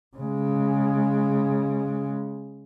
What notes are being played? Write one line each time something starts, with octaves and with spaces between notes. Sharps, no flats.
C#3 G#3